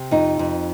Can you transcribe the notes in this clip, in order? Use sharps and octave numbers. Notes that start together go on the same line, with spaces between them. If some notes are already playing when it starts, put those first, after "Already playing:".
Already playing: C3
F2 D#4
F2